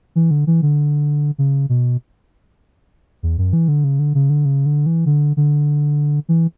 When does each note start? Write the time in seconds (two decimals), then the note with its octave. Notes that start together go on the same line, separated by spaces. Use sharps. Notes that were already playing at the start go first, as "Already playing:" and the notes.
0.16 E3
0.31 D3
0.47 E3
0.62 D3
1.38 C#3
1.69 B2
3.23 E2
3.38 F#2
3.53 E3
3.68 D3
3.84 C#3
3.99 D3
4.15 C#3
4.30 D3
4.45 C#3
4.66 D3
4.86 E3
5.06 D3
5.37 D3
6.29 E3